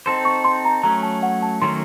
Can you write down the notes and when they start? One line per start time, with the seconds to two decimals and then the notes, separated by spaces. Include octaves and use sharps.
0.06 C4 D#4 A4 C5 C6
0.25 C#6
0.44 C6
0.65 A#5
0.83 F#3 A3 C#4 A#5
1.03 A5
1.23 F#5
1.42 A5
1.61 D#3 F#3 A3 C#4 C6